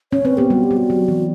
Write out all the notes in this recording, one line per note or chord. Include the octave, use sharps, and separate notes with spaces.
C#4 C#5
C4 B4
B3 G4
G3 F#4
G4
G3
F#4
F#3
E3